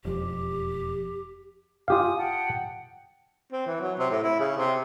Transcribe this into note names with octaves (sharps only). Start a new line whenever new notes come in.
E1 F2 G4
F4 G4 F5 G#5 D#6
F#5 G5 A5
C4
E3
F#3
C3
A2
E4
C#3
C3